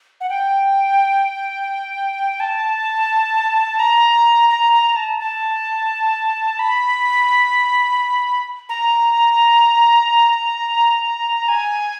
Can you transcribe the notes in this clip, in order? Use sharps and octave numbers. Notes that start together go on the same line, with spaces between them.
F#5
G5
A5
A#5
A#5
A#5
A5
A5
B5
A#5
G#5